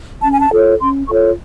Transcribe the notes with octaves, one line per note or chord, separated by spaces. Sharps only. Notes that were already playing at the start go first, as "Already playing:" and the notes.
C#4 A5
G#5
A5
F4 A4 C#5
C#4 C6
F4 A4 C#5 C#6